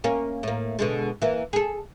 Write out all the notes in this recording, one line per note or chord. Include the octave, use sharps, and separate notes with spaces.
A#3 C#4
A2 A#3
B2 D3 G#3
E3 A#3
G#4 A4